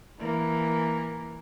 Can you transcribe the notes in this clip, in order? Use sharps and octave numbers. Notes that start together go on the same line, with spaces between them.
E3 A#3